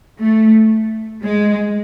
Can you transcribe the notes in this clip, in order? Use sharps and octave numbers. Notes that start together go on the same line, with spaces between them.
A3
G#3